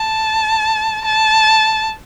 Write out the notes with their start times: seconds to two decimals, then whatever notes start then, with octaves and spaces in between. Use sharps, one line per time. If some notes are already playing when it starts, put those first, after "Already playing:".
Already playing: A5
1.05 A5